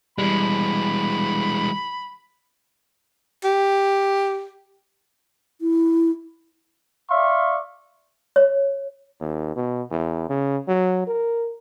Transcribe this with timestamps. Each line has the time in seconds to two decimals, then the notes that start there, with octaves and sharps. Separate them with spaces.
0.18 E3 G3 G#3 B5
3.44 G4
5.61 E4
7.10 D5 E5 F5 C6 C#6
8.36 C#5
9.21 D#2
9.56 B2
9.91 E2
10.30 C#3
10.68 F#3
11.07 A#4